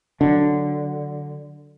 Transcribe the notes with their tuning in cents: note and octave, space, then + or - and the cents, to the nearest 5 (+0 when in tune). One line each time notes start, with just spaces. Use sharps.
D3 +0 F#3 +0 D4 +0